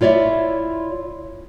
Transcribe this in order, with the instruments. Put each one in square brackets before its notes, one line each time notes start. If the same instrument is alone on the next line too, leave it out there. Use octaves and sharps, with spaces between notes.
[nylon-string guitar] E4 F4 C#5 D5 E5